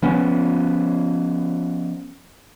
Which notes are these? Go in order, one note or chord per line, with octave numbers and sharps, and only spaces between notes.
F3 B3 C#4